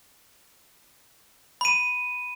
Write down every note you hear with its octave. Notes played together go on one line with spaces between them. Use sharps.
B5 D#7